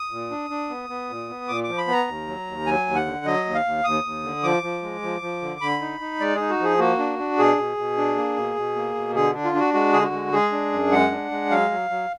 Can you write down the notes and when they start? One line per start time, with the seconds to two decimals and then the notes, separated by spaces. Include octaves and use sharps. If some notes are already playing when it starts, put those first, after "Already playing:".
Already playing: D#6
0.11 A#2
0.31 D4
0.50 D4
0.70 B3
0.90 B3
1.09 A#2
1.29 B3
1.48 A#2 D6
1.64 D6
1.69 F3
1.78 B5
1.88 B3 A#5
2.07 D#2
2.27 F#3
2.47 D#2
2.66 F#3 G#5
2.86 D#2
2.96 F#5
3.06 D3
3.26 F#3 D#5
3.45 D#2
3.55 F5
3.65 D#2
3.84 D#2 D#6
4.04 D#2
4.24 D3
4.43 F3 D6
4.63 F3
4.82 G#3
5.02 F3
5.22 F3
5.42 D3
5.61 D3 B5
5.81 D#4
6.00 D#4
6.20 G#3 D5
6.35 D#4 G#4
6.50 F#4
6.60 F3 G#4
6.79 A#3 F#4
6.99 D4
7.19 D4
7.38 B2 G#4
7.58 B2
7.77 B2
7.98 D4
8.16 A#3
8.36 B2
8.56 B2
8.76 A#3
8.95 B2
9.15 D3 G#4
9.34 D4
9.45 F4
9.55 D4 F#4
9.74 G#3 F#4
9.93 D3 G#4
10.04 F#4
10.13 G#3
10.33 G#3 G#4
10.52 D4
10.72 F#2
10.92 G#3 F#5
11.12 D4
11.31 G#3
11.50 F#3 F5
11.71 F#3
11.90 F#3